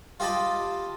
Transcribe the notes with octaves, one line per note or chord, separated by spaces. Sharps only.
F4 G4 D#5 A5 B5